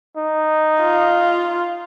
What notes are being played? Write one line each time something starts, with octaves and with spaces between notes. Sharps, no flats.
D#4
F4